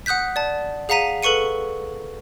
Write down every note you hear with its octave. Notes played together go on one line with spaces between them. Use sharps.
F#5 D#6 F#6 G6 B6
D5 A5
G#4 F5 F#5 A#5 B6 D#7
A4 B4 C#6 C#7 D#7